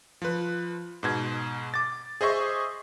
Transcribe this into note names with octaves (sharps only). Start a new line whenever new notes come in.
F3 B4
G#2 B2 G#6
D6 A6
G#4 C5 D#5 E5 C#6